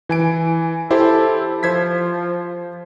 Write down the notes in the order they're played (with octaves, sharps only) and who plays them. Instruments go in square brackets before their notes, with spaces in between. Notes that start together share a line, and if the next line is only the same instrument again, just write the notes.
[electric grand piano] E3 G#5 D7
[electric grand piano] E4 G4 C5 [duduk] A4
[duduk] F3 [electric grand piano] C5 G#6 B6